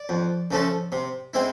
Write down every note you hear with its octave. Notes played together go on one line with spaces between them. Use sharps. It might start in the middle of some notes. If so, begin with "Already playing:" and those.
Already playing: D5
F2
C#3 F3 A3 C#4
C3
G#3 C4 E4